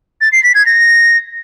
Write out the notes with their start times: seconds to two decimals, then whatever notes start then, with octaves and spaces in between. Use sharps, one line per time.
0.21 A6
0.32 C7
0.44 B6
0.55 G#6
0.66 A#6